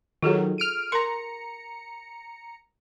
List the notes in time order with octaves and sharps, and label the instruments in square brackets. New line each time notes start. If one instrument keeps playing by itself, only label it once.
[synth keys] D#3 F#3 [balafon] F4 G#4 A4
[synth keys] F6 D7 D#7
[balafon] A#4 C6 [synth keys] A#5 C#7